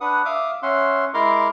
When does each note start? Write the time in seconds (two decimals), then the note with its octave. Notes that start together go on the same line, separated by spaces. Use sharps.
0.01 D4 B4 F#5 D#6
0.25 E5 F5 D6 D#6
0.63 C#4 E5 F#5 C6
1.14 G#3 E4 A#4 A#5 C6 D6